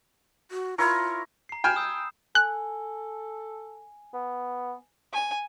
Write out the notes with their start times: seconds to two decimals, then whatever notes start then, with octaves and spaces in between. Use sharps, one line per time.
0.51 F#4
0.78 E4 F4 A#4 C#5
1.49 A#5 C7
1.64 G5 G#5 B5 F6 E7
1.76 D#6 E6 G6
2.35 A4 G#5 F#6
4.14 B3
5.13 G#5